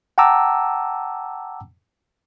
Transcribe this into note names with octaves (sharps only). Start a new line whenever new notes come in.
F#5 G5 A5 A#5 D6 E6